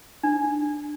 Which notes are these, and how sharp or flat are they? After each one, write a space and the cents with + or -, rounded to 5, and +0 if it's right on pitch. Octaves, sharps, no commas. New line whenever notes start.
D4 +15